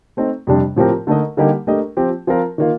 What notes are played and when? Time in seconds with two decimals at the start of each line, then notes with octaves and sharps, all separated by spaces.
0.17 A3 C4 D#4
0.47 F2 C3 G3 D4
0.76 A2 F3 C4 G4 A#4
1.07 D3 A3 D#4 A#4 D#5
1.37 D3 G3 A#3 D#4 G4
1.67 A3 D4 G4 A#4 D#5
1.97 F3 C4 G4
2.27 F3 C4 F4 A#4
2.58 D#3 A#3 F4